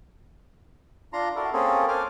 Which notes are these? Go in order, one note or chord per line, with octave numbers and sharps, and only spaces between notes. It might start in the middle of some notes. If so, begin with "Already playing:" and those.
D4 F4 A#5 C6
D4 E4 F#4 A4 A#4
A#3 C4 C#4 G#4 A4
A4 C5 G#5 D6 F6